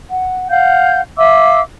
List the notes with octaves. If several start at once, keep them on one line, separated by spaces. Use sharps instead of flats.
F#5
F5 F#5 G6
E5 F5 D6 E6